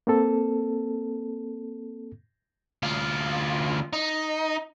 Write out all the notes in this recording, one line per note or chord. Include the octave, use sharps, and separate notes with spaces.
A#3 C4 A4
D2 F4
D#4